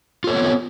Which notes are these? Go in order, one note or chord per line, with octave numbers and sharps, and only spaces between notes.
B3 C4 F4 A4 C#5